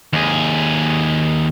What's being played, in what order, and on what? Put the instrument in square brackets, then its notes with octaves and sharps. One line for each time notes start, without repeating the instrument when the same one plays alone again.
[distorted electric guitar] D#2 G#4